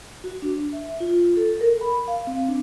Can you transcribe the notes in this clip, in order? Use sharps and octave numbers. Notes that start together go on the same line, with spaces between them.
F#4
D4
E5
F4
A4
A#4
B5
F5
C4
D4